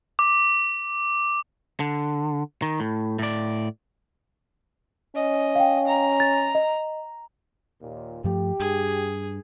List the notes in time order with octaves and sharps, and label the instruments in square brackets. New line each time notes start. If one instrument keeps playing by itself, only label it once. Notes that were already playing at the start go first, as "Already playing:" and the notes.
[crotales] D6
[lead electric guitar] D3
D#3
A2
A2 D5
[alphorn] C#4 [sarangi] D#5
[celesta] F5 G5
[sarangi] A#5
[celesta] A6
D#5
[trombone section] D#2 A#2
[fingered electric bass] G2 F3 A3 [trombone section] G4
[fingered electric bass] G2 [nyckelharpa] G#4